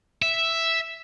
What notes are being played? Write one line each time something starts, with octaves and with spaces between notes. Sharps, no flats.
E5